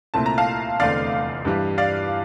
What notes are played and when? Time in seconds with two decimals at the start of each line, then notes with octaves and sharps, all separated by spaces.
0.14 C2 A#2 A3 C4 E4 A5
0.26 A#5
0.38 F5 A5
0.80 F1 E2 D3 A3 C4 D5 F5
1.45 G2 E3 G3
1.78 D5 F5